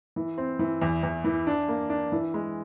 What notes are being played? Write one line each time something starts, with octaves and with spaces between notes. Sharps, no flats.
E3
C4
E3
E2
E2
E3
D4
A#3
D4
E3
G#3